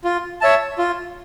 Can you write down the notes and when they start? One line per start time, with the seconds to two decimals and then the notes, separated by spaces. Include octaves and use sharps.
0.04 F4
0.41 C#5 E5 A5
0.78 F4